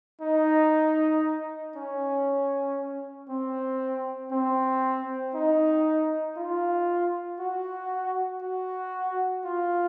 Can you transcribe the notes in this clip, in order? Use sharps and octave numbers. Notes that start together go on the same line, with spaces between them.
D#4
C#4
C4
C4
D#4
F4
F#4
F#4
F4